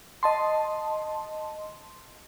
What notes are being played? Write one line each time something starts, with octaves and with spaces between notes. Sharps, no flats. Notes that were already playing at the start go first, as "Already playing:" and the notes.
D#5 A5 C6